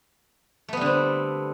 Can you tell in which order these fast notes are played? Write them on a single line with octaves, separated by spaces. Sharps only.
A3 B3 G3 D3 C4